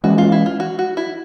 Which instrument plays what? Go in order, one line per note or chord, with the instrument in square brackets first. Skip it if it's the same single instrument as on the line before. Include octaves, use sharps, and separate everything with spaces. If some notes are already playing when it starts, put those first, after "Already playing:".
[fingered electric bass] E3 G#3 C#4 [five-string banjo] F#4
[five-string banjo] F4
E4
F4
F#4
F#4
E4